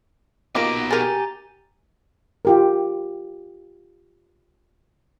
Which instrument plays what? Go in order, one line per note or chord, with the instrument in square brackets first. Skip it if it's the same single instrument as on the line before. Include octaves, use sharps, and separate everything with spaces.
[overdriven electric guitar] B2 D#4 [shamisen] A#3 F4 G4 [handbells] D6 A#6 D7
[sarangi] G4 [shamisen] G#4 A#4 [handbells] G#5 A#5 A6
[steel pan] F4 G4 A#4